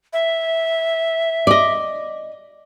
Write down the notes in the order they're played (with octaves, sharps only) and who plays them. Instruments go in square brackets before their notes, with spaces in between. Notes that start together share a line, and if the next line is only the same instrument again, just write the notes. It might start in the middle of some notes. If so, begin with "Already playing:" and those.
[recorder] E5
[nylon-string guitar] D5 D#5